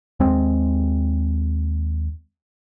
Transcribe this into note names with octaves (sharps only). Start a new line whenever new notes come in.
D#2 G#3 C4